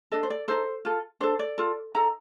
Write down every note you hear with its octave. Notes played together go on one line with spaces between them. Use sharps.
D4 A4 D#5
C5
D5
D#4 A4 C5
F4 A4
D4 A4 C5
D5
F4 A4
D#4 A4 A#5